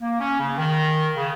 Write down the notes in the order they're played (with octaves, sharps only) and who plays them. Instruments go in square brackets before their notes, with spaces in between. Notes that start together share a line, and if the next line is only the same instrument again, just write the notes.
[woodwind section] A#3
C#4
C#3
D#3
C#3